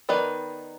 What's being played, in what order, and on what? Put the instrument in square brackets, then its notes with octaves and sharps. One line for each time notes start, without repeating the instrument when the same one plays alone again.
[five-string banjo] D#3 B3 D#4 B4 D5